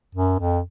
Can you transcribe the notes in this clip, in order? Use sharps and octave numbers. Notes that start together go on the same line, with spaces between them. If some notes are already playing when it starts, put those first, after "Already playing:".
F#2
F2